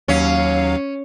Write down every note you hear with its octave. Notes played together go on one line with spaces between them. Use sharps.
D#2 F#3 C#4 F5